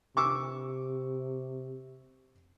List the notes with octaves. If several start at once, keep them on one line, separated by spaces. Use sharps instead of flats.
C3 C#6 D6 E6